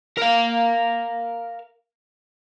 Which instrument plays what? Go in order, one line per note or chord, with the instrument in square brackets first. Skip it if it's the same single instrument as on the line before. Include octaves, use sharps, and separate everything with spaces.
[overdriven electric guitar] A#4 F5